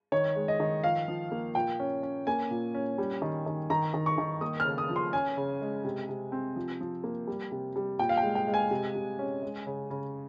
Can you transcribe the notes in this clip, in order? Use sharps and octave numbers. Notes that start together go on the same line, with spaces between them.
D#3 C#5
G#3
D#5
D#3
F3 F5
F3
A#3
A#2 G5
C#4
C#4
A#3 G#5
A#2
C#4
G3
D#3
D#3
D#3 A#5
D#3
C#6
D#3
A#3 D#6
F6
C#3
D#6
F3
C6
C#4 G#5
C#3
G#3
C3
C3
C4
F3
F3
A#3
G3
C3
G3
A#2 G5
F5
G5
G#3
G5
G#3
G#5
C3
C3
C#4
G#3
C#3
C#3